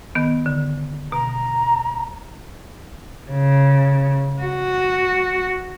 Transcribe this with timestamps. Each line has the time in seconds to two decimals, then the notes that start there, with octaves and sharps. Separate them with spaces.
0.15 D#3 B3
0.46 D3
1.12 B2 A#5
3.31 C#3
4.42 F#4